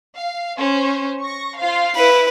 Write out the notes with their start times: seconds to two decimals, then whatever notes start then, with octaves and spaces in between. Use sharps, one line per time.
0.17 F5
0.57 C#4 C5
1.23 C#6 A#6
1.59 F4 C5 F5
1.95 E4 B4